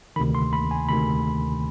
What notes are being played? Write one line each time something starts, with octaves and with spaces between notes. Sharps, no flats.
D2 C3 D#3 B5
C6
B5
G#5
D2 C3 D#3 B5